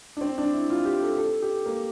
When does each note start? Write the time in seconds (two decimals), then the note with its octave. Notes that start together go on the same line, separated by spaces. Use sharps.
0.17 D4
0.21 C4
0.38 D4
0.53 E4
0.70 F4
0.85 G4
1.02 A4
1.18 A4
1.42 G4
1.66 A#3